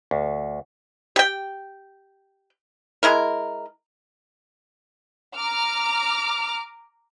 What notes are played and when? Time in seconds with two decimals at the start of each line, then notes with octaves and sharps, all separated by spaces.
0.11 D2
1.16 G4 G5
3.03 G#3 E4 A#4
5.35 A#5 D6 F6